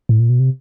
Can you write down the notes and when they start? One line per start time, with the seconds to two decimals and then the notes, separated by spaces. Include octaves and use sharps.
0.09 A2
0.20 A#2
0.30 B2
0.40 C3